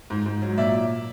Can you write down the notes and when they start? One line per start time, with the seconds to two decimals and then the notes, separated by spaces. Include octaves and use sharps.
0.10 G#2
0.26 G#2
0.42 F#3
0.58 A#2 D5 E5